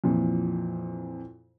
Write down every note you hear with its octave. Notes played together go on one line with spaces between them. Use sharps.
F2 A#2 E3 F3